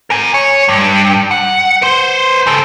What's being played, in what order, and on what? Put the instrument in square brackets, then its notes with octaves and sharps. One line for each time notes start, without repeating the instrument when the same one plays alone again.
[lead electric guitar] A#4 G#5
C#5
G2
F#5
B4 C5
C#3 A4